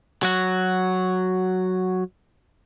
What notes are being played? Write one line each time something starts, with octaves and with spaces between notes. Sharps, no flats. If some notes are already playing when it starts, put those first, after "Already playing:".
F#3 F#4